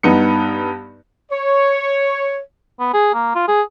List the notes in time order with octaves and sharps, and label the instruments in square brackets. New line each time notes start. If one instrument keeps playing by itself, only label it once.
[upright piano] G2 B3 D#4 C#7
[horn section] C#5
[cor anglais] B3
G#4
A#3
F4
G#4